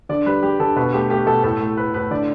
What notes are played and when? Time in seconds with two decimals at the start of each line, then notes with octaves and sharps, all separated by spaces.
0.09 D3 D5
0.26 G3 B4
0.43 G3 G4
0.59 D3 A4
0.76 B2 B4
0.93 A3 G4
1.10 A3 G4
1.27 B2 A4
1.44 A2 A4
1.60 A3
1.77 A3 B4
1.94 A2 B4
2.11 D3 D5